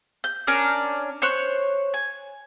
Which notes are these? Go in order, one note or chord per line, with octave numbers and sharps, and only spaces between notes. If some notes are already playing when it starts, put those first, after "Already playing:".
G6
C#4 D4 A#4 D5
C5 C#5 C#6 F#6
G#5